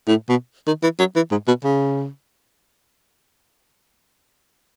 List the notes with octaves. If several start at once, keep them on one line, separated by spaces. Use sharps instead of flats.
A2
B2
D#3
E3
F#3
E3
G#2
B2
C#3